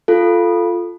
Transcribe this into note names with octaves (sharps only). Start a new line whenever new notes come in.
F4 A4